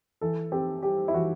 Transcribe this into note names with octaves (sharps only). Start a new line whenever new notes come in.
E3 A4
C4 G4
G3 G4
E4
E3 F#4